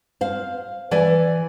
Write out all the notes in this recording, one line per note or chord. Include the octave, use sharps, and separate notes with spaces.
C5 F5
E3 D5 G#5